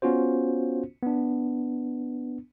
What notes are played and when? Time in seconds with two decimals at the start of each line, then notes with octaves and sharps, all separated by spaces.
0.02 B3 C#4 F4 F#4 C5
1.03 B3 D4